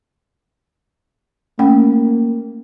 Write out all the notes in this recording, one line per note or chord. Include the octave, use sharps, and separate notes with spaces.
A3 A#3 C#4 G5